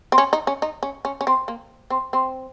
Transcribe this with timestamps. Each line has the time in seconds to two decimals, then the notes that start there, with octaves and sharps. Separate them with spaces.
0.12 C4
0.18 C#4
0.33 D#4
0.47 C#4
0.62 D#4
0.83 C#4
1.05 C#4
1.21 C#4
1.27 C4
1.48 A#3
1.90 C4
2.13 C4